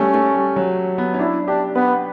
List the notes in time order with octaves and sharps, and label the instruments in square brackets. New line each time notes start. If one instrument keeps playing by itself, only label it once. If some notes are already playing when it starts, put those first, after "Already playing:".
Already playing: [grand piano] G3 A3 [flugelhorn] C#4
[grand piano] A3
G3
F#3
B3
C#4
[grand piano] D4 [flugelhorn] E4
[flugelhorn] D4 [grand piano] G4
[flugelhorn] B3 [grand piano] B4